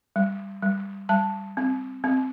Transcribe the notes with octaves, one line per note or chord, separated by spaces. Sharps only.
G3
G3
G3 A5
C4
C4